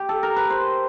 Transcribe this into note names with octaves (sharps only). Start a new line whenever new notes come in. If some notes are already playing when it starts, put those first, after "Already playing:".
Already playing: G4
A4
A#4
B4
C5